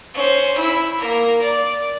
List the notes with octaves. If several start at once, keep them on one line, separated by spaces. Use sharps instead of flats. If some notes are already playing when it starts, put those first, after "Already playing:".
C#4 C5
E4
A#3 A#4
D5